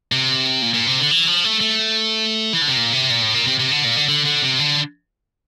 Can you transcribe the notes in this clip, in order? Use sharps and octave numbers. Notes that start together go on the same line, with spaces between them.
C3
A#2
A#2
C3
D3
E3
F3
A3
A3
E3
D3
C3
A#2
C3
A#2
A2
A#2
C3
C3
D3
A#2
D3
D3
D3
C3
D3